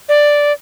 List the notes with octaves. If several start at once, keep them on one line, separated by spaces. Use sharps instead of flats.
D5